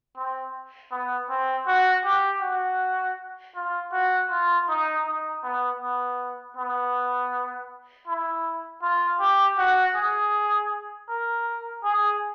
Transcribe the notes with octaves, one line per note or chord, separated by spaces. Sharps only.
C4
B3
C4
F#4
G4
F#4
F4
F#4
F4
D#4
D#4
B3
B3
B3
E4
F4
G4
F#4
G#4
A#4
G#4